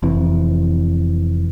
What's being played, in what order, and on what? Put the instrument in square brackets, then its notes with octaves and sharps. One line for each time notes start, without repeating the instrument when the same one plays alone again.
[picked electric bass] F1 C3 E3